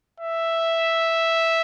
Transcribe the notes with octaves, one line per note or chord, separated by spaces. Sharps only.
E5